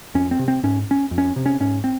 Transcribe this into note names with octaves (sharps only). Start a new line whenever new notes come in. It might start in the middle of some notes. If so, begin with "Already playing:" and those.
F2 C#4
C4
C3
C4
G#2 C#4
C#4
F2
C#4
C3
C#4
G#2 C#4
C4